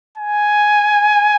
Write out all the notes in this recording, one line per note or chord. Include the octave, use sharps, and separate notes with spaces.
G#5